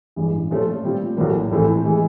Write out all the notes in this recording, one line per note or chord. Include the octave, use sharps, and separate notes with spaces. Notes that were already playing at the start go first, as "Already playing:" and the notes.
A1 G2 E3 G#3
A#2 F3 A3 C#4 F4
A#2 G3 C4 F4
A#1 A2 F#3 A#3
A#1 A2 E3 A3 C4
E3 G#3